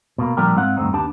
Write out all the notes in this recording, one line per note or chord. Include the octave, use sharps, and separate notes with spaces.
B2 A#3
A#2 D3 F3 G3 G4 A#4
G#2 G#3 C4 F5 F#5
D2 G2 A3 C4 D#4
D#2 B3 D4 G4 A5